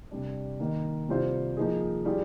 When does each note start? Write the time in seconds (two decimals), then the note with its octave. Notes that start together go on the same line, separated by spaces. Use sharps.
0.11 C3 G3 D4
0.60 D#3 A#3 D#4
1.09 C3 G3 C4 F4 C5
1.57 F3 A#3 D#4 G#4
2.05 G3 D4 F4 G#4